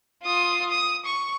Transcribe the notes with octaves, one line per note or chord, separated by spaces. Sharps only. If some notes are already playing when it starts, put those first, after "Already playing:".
F4 D#6
D#6
C#6